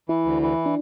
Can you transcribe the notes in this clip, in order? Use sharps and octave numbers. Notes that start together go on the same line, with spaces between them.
E3 E4
D2
E3
D4